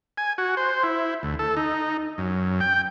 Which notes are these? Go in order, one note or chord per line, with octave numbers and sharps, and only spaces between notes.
G#5
F#4
C5
E4
D2
A4
D#4
F#2
G5